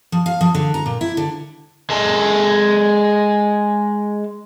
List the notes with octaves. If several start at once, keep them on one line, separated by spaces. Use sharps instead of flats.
F3
F5
F3
D3
A#5
A#2
E4
D3
G#3 A4